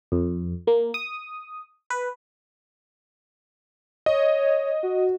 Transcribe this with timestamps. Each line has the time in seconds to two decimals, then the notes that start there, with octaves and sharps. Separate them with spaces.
0.12 F2
0.67 A#3
0.94 D#6
1.90 B4
4.06 C#5 D#5
4.83 F#4